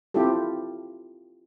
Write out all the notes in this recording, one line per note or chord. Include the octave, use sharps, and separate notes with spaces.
C4 E4 F4 G4 A4